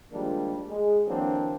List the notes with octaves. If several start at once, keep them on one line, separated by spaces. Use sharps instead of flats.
D#3 F3 G3 G#3 A#3 D4
G#3
D3 E3 F#3 A#3 C4 D4